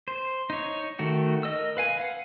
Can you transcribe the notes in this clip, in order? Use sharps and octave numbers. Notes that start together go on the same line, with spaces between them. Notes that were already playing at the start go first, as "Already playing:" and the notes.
C5
D#4 C#5
D#3 A3 F#4
A#4 D#5 E6
B4 F5 G#5
F5 F#5